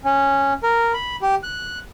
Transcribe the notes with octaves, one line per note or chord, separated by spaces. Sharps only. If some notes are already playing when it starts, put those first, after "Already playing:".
C#4
A#4
B5
G4
F#6